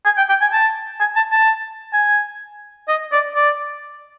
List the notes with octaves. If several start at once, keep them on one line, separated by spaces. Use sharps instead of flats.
G#5
G5
G5
G#5
A5
G#5
A5
A5
G#5
D#5
D5
D5